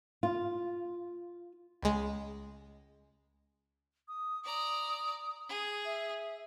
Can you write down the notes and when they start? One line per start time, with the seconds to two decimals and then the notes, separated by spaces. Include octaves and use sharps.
0.23 F4
1.82 C#2 G#3
4.08 D#6
4.44 D5 A#5 D#6
5.49 G#4
5.85 E5